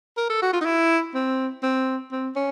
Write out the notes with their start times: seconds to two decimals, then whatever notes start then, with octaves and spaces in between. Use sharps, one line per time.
0.17 A#4
0.30 A4
0.42 F#4
0.53 F4
0.61 D#4
0.66 E4
1.14 C4
1.63 C4
2.12 C4
2.36 C#4